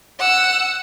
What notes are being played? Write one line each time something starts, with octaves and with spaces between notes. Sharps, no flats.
F#5 E6